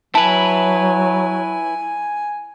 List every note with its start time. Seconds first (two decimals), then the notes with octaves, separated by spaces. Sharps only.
0.15 F#3 E4 B4 G#5 A5